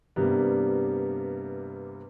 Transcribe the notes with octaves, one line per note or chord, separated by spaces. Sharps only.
G2 C3 G3 A#3 B3